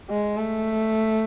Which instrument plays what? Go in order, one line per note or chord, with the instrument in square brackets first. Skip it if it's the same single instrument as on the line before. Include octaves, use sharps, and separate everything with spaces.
[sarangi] G#3
A3